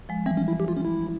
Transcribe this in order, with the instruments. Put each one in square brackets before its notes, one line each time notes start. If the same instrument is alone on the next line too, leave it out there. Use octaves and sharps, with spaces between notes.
[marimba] F3 G#3
[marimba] E3 G3 [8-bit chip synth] C4
[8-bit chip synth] C#4
E4
G4
F4
C#4
E4